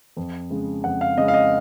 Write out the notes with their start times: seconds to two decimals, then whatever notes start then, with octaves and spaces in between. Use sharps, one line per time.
0.17 F2
0.50 C#3 G#3
0.84 F2 F#5
1.01 F5
1.17 C#3 G#3 D#5
1.28 F5
1.34 D#5